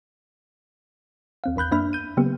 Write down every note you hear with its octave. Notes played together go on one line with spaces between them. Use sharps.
D#2 C4 F5
G#1 E2 B5 F#6 G6
F#2 A#3 D4 E5 B5 F6
G6 D#7
C#3 F#3 A#3 B3 G4